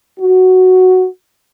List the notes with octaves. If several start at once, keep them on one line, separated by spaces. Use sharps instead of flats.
F#4